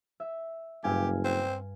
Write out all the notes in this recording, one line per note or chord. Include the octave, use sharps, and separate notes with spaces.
E5
F#1 G2 G4 F5 G#5
C4